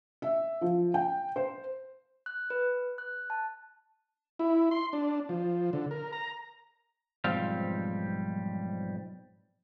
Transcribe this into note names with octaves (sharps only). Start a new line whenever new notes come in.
E5
F3
G5
C5
F#6
B4
F#6
A5
E4
C6
D4
F3
D3
A#4
A#5
B1 G#2 F3 G3 C4 F5